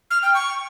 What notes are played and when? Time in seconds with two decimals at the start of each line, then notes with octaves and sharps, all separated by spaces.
0.10 F6
0.22 G5
0.34 C#6